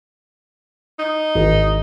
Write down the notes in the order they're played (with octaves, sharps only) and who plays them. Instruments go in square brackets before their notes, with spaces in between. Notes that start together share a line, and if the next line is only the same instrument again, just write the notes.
[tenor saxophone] D#4
[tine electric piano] G#1